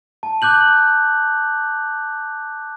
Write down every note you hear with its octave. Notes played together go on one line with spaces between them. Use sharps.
A5
D6 F#6 G6 F#7